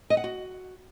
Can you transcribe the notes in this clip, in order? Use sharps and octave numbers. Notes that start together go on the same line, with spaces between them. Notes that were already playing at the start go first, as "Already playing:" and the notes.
D#5
F#5
F#4